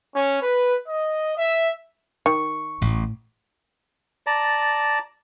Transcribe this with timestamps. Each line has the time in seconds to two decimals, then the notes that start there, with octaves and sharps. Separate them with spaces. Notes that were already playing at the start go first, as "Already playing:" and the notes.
0.13 C#4
0.41 B4
0.86 D#5
1.35 E5
2.26 D#3 C#6
2.81 A1 A2
4.27 D5 A5 A#5